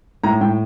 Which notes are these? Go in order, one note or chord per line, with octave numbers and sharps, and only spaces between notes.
A2 A#5
A2 G5